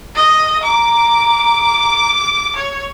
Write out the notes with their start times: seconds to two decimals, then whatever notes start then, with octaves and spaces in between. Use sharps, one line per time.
0.16 D#5
0.63 A#5 D6
2.56 C#5